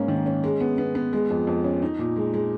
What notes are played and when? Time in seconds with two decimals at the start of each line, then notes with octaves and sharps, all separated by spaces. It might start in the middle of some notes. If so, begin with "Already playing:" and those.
Already playing: G#2 A#3 C#4
0.08 D#3
0.26 C#4
0.44 G#3
0.60 B3
0.78 B3
0.95 B3
1.13 G#3
1.30 F2
1.47 F2
1.64 C#4
1.82 D#4
1.99 A#2
2.16 G#3
2.34 G#3